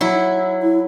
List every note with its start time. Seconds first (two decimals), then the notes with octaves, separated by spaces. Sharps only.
0.01 F#3 E4
0.63 E4